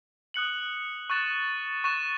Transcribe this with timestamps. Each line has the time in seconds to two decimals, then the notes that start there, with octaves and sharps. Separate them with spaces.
0.34 D#6 F#6 C#7 F#7
1.10 C#6 F#6 A6 E7
1.84 C#6 F#6 A6 E7